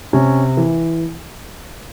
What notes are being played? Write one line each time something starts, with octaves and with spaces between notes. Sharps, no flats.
C3 C#4
E3